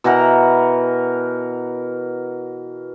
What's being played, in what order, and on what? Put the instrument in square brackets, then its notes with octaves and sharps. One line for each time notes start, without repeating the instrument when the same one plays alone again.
[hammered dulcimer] B2 E3 A#4 F#5